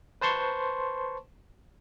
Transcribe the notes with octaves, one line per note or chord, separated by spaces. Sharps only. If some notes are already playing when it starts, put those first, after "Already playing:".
B4 C5 A5 C6 C#6